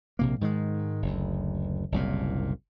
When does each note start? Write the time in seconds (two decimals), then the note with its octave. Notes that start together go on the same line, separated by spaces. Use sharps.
0.19 A#1 C3 A#3
0.41 G#2 D#3 F#3 G#3
1.02 F#1 D2
1.92 F#1 C2 A#2